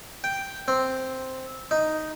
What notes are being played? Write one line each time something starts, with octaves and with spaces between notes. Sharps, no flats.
G5
C4
D#4